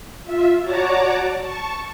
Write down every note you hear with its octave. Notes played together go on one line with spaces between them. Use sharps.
F4 E5
F#4 C#5 D5 A5 A#5 D6
A5 C#6